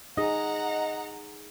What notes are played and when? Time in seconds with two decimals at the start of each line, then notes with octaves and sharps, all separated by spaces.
0.17 D#4 G#4 D#5 F#5 A#5